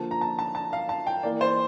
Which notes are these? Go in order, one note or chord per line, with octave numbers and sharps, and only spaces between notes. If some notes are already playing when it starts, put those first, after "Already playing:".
Already playing: D3 F3 A#3 A5
A#5
A5
A5
A5
F5
A5
G5
E3 A#3 D5
C5